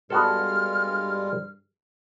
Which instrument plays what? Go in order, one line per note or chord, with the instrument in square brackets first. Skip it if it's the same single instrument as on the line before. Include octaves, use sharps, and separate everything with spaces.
[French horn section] G2 G3 [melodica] G#3 F4 [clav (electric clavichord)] B3 F#4 A4 [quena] F6